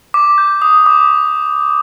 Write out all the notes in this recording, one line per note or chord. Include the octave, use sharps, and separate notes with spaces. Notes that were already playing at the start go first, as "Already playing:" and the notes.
D6
G6
D#6
D6